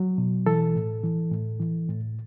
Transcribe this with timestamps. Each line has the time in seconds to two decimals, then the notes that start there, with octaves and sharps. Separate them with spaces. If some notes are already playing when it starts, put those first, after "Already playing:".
Already playing: F#3
0.18 B2
0.46 E3 A4
0.75 A2
1.03 E3
1.32 A2
1.60 E3
1.89 A2